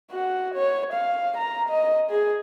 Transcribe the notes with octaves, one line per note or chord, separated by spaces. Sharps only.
F#4 F#5
C#5
F5
A#5
D#5
G#4